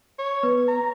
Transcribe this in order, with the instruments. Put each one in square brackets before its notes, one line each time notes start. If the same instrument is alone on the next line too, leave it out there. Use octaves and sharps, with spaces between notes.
[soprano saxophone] C#5
[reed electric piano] B3 [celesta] B4
[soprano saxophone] A#5